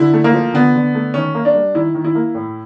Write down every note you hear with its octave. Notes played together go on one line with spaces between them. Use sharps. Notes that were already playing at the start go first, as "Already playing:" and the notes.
Already playing: D3 E4
A3
A#3
F3
D3 B3
D3
A3
D#3 C#4
A#3
D4
G3
D#3 E4
D#3
E4
A#3
A2